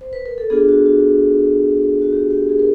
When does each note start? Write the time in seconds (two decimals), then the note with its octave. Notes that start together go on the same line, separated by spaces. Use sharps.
0.01 C5
0.13 B4
0.26 A#4
0.38 A4
0.50 B3 D4 F4 G#4
0.69 F#4
0.86 F#4
2.02 F#4
2.13 G4
2.31 G4
2.49 G#4
2.59 A#4